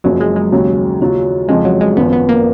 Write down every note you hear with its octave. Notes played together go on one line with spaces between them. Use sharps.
F#1 F#2 F3 F#3
G#3
G#3
D#2 C#3 F#3 C#4
D#2 C#3 F#3 C#4 F4
F2 C#3 F3 G#3
F#3
G#3
G#1 F#2 F3 B3
B3
A#3